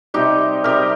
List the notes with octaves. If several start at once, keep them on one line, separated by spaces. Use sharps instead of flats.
C3 G3 D#4 G4
C3 G3 G4 A#4